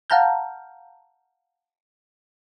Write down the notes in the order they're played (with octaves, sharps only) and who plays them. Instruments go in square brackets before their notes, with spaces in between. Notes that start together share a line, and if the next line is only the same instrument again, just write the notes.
[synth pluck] F5 F#5 A5 A#5 F6 G6